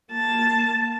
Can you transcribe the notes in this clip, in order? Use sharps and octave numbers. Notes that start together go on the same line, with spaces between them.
A#3 A5